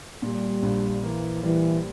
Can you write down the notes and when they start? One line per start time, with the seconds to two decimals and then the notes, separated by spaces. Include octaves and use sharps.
0.22 A#2 G3
0.63 A#1
1.02 E3 A#3
1.43 E3 G3